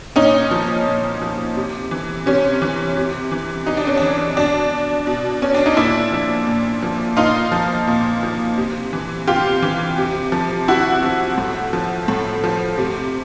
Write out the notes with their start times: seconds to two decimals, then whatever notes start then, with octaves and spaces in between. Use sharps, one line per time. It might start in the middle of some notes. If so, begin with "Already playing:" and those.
0.16 A#2 C#4 D#4
0.51 F3
0.86 A#2
1.22 F3
1.56 C3
1.91 E3
2.26 C3 C#4
2.62 E3
2.96 C3
3.31 E3
3.66 C3 D#4
3.77 D4
3.87 C#4
3.97 E3 D4
4.37 B2 D4
5.07 B2
5.42 C#4
5.54 D4
5.66 D#4
5.77 A#2 D4 E4
6.12 F3
6.47 A#2
6.83 F3
7.17 A#2 D#4 F4
7.52 F3
7.87 A#2
8.23 F3
8.57 C3
8.93 E3
9.27 C3 F4 G4
9.62 E3
9.98 C3
10.32 F3
10.68 C3 E4 F#4
11.03 F3
11.38 A2
11.73 F3
12.08 A2
12.44 F3
12.78 C3